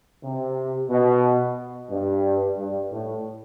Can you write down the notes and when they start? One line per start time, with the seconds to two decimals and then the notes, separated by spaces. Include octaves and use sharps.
0.24 C3
0.90 B2
1.91 G2
2.58 G2
2.92 A2